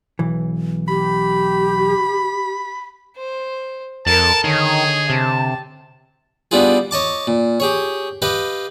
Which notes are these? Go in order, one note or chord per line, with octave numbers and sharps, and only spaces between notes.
B1 E3
G4 B5
C5
F2 A4 A#4 A5
D3 D#3 G#4 C#5 D#5
C3 A5
G3 B3 D4 E4 F4 G#4
C#5 D#5 A5 D6
A#2
G4 G#4 C#5
G4 B4 D#5 F5